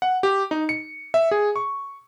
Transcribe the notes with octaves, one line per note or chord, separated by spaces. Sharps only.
F#5
G4
D#4
C#7
E5
G#4
C#6